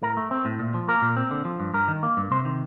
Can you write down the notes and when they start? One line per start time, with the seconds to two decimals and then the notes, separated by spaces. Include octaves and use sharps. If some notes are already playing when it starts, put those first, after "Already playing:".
0.02 A2 A#4
0.17 A3
0.31 C4
0.45 A2
0.59 A#2
0.74 F3
0.88 A#3 A#4
1.02 A#2
1.16 C4
1.31 D3
1.45 F3
1.60 G2
1.74 G2 A#4
1.88 D#3
2.03 A#3
2.17 G2
2.31 C3 C5
2.45 D#3